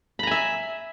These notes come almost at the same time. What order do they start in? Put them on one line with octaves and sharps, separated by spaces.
B5 A#5 G#5 E5